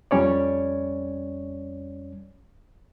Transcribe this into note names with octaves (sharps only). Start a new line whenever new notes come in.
F2 G3 C#4 C#5 D5